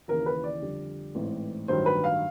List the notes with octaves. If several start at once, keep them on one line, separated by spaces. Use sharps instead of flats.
D#2 C#3 E3 A#4
B4
D5
F2 D3 G3
A1 G#2 E3 A3 C4
A1 G2 D#3 F#3 C5
B4
F5